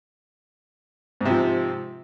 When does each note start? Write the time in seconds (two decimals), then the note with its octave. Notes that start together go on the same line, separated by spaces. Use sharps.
1.21 G#2
1.25 C3
1.30 F3